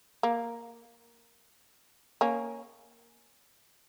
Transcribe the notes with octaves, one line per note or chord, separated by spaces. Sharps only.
A#3
A#3 C#4